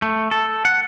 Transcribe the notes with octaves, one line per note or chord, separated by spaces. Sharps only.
A3
A4
F#5